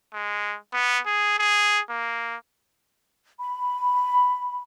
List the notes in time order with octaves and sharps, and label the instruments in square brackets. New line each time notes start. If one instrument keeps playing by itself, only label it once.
[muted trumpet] G#3
B3
G#4
G#4
A#3
[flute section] B5